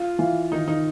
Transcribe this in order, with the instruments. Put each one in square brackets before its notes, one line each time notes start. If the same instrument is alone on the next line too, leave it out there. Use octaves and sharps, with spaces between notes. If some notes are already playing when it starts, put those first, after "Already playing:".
Already playing: [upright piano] F4
[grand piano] E3 [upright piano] F4
[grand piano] D#3 [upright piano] D#4
[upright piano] D#4